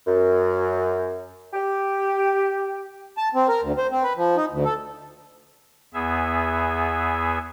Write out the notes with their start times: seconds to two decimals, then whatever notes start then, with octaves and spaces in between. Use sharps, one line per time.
0.07 F#2
1.54 G4
3.17 A5
3.35 C4
3.48 A#4
3.62 D2
3.78 C5
3.91 C4
4.03 B4
4.17 F3
4.37 D#4
4.51 D2
4.65 A4
5.94 E2 B3 G#4 E5